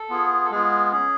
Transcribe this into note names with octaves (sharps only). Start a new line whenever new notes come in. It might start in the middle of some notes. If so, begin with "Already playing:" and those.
Already playing: A4
B3 F4 G#4
A4
G#3 B3 F4 G#4
C#4 G#4